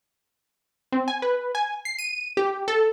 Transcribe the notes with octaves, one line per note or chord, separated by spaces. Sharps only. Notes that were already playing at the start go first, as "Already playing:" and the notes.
C4
G#5
B4
G#5
C7
D#7
G4
A4